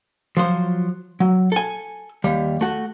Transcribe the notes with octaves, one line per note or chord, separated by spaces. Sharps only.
F3 F#3 C5
F#3
A4 G#5
D#2 G3
A3 F#4